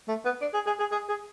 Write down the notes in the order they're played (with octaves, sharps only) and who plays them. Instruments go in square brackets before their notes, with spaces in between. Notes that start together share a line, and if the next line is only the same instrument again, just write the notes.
[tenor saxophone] A3
B3
D4
G#4
G#4
G#4
G#4
G#4